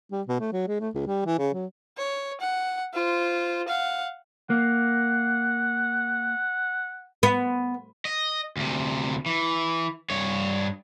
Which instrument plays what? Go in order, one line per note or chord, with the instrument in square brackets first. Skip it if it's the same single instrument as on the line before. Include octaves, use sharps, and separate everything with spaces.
[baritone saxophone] G3
B2
A3
F#3
G#3
A3
C#2
G3
E3
C#3
F#3
[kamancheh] C#5
F#5
F4 C5
F5 F#5
[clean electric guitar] A#3 [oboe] F#5
[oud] B3
[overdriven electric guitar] D#5
D2 C3
E3
G2 C#5